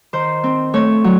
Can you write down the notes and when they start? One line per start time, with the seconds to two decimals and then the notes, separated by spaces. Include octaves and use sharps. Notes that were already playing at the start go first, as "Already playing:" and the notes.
0.13 D#3 C5
0.44 C4
0.74 A3 C#5
1.04 F#3